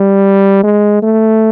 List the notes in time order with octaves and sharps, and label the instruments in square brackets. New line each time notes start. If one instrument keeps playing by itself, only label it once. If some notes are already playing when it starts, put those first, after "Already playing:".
Already playing: [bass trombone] G3
G#3
A3